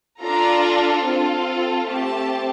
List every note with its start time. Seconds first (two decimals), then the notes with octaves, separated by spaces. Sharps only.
0.22 D4 F4 A4 A#5
1.05 C4 F4 A4
1.88 A3 C4 G4 A5